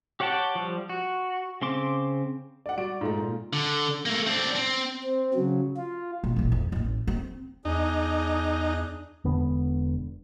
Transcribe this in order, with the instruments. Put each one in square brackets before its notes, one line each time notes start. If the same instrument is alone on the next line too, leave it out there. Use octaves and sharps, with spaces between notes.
[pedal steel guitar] G4 C#5 F#5 G5 A5
F3 G3
F#4
C#3 C4 C6 D6
[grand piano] D5 F#5
[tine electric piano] G3 F#4 D5 [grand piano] D7
[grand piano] G#2 A3 A#5 [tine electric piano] F4
[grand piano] A#2
[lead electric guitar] D3
A3 A#3
C4 D4
C4
[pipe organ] C4
C#3 F#3
F4
[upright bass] B2
A#1 E3
F2
A1 C#4
C4
[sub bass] E2 [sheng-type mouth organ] D4 G#4 [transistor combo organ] D#4
[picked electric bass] E1 D3 B3